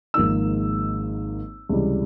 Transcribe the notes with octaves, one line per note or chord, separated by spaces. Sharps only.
G#1 G#2 F3 A#3 D#4 E6
C#2 C3 E3 G3